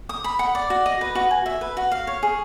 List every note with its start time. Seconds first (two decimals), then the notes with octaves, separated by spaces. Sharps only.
0.09 D#6
0.24 B5
0.39 F#5
0.55 D5
0.70 F#4
0.86 D#5
1.01 B4
1.15 F#4
1.31 G#5
1.46 E5
1.61 B4
1.77 F#4
1.91 F5
2.07 C#5
2.23 G#4